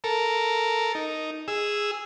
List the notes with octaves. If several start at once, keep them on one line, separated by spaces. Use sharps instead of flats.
A4 A#4
D#4
G#4 E6